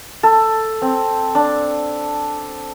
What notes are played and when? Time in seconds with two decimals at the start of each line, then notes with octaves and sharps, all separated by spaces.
0.23 A4
0.82 C4
1.35 D4